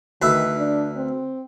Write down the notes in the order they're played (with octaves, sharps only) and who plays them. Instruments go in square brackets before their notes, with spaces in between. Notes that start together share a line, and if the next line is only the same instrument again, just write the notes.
[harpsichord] D2 B4 E5 [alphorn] D#3
[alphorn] D4
C4